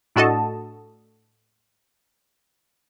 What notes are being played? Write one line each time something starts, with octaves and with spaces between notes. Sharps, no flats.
A2 D4 F#4 A4 D#5 A5